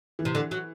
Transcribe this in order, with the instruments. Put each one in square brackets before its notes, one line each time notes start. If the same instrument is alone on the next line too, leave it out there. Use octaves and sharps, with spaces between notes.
[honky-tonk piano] E3
[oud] C3
D3
F#3